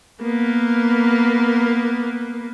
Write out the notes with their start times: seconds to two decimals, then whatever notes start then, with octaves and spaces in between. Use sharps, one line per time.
0.22 A#3 B3